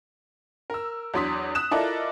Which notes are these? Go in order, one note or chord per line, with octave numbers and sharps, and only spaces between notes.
A#4 E6
E2 F#3 D4 C6 D#6 B6
D#6 F#6 E7
E4 F4 A4 A#4 D5 D#5